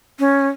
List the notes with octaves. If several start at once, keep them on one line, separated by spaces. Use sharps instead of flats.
C#4